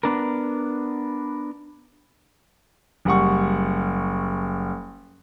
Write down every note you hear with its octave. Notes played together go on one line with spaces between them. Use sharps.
B3 D4 A#4
F#1 G3 F#5 C#6